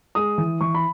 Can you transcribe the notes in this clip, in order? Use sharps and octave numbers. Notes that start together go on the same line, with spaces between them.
G#3 D#6
E3
E3 C#6
B5